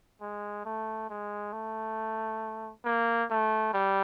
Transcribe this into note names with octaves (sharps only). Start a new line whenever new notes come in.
G#3
A3
G#3
A3
A#3
A3
G3